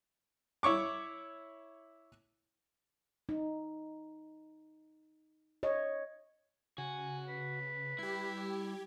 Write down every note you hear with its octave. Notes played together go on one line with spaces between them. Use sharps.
E4 C#5 C#6 D6
D#4
C#5 D#5
C#3 F#4 G#5
B4
G3 E4 G4 G#6